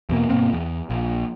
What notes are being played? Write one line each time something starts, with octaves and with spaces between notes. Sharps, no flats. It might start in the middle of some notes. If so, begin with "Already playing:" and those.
E2 B2 A#3
G2 B2 A#3 C4
E2
A#1